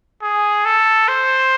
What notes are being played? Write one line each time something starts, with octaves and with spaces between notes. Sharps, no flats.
G#4
A4
C5